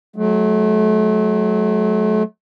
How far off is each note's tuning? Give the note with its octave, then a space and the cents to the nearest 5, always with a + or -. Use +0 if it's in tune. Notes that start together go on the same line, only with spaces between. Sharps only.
F#3 +0 A3 -35